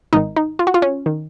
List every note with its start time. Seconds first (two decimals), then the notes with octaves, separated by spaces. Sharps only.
0.13 G#1 G#2 D#3 D#4
0.36 D#4
0.59 F4
0.67 F#4
0.74 F4
0.82 C#4
1.06 D#3